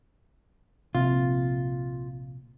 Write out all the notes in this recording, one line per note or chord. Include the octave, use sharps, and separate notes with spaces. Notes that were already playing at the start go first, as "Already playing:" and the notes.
A#1 C3 C4 F4